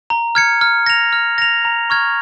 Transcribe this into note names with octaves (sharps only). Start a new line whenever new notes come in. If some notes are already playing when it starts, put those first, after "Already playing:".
A#5
F6 G#6 C#7
F6
A#6 F7
F6
A#6 F7
A#5
C#6 F6 G#6